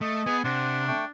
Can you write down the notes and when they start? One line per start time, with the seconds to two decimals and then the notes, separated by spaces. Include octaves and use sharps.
0.01 A3 D#5
0.26 B3 G#4
0.44 C3 D4 C5 F#5
0.87 A3 G5 C#6